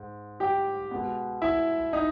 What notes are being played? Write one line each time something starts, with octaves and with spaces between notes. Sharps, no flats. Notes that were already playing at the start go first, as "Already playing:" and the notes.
Already playing: G#2
G4 G5
B2 G#3 B3
E4 E5
D#4 D#5